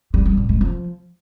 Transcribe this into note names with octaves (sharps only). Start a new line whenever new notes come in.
G3
G3
A2
G#3
F3